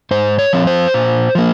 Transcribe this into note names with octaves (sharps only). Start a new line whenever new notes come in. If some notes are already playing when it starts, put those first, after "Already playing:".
G#2 C5
C#5
F3 C4
C5
A#2
F3 A#3